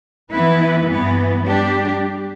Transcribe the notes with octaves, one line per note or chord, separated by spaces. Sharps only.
E3 B3 E4 B4
G2 E3 B3
G3 D4 G4